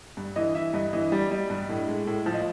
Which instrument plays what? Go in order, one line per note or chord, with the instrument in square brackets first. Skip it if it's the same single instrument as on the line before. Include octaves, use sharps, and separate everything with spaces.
[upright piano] G2
E3 D#5
E3 E5
G2 D#5
E3 D#5
G3
G3
G2
A2
G#3
A2
F3
D#5